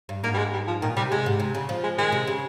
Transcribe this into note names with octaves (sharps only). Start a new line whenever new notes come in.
G2
G#2 A#3
G3
G#3
G3
F3
A#2 D#3
C3 G3
C3 G#3
G#2
C3
C#3
F3
G#3
D#3 G#3
C3
C#3